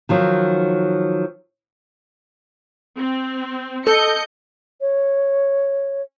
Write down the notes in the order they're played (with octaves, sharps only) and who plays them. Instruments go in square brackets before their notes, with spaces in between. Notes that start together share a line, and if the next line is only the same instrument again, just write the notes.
[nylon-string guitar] D#3 F3 F#3
[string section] C4
[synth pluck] A4 [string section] D#5 G6 C#7
[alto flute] C#5